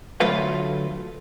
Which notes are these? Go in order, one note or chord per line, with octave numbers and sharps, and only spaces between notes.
D2 F#3 A3 F4 B4 F5